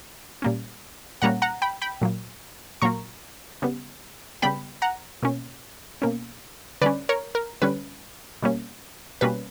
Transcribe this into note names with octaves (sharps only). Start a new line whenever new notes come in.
A#2 G3 A#3 C#4
A#2 G3 A#3 C#4 F#5 A#5
F#5 A#5
G5 B5
G5 B5
A#2 F#3 A#3
A#2 F#3 A#3 A#5 C#6
C#3 G3 B3
C#3 G3 B3 G5 B5
F#5 A#5
B2 A#3 C#4
B2 A#3 C#4
D3 G3 C#4 B4 D5
A#4 C#5
A#4
D3 G3 C#4 B4
B2 G3 A#3 C#4
B2 G3 A#3 C#4 B4